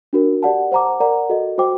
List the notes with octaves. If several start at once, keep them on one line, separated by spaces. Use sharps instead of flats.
D4 F#4 A#4
G4 D5 F#5 A5
C5 F#5 A#5 D6
A#4 D5 F#5 A#5
F#4 A4 D#5
F#4 C5 G5 D6